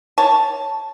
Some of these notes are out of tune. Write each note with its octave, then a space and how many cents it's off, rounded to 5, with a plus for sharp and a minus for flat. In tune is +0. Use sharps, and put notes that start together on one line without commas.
C#5 +0 A5 +0